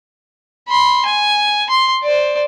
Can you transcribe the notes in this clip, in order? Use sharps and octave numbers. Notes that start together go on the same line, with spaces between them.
B5 C6
G#5
C6
C5 D5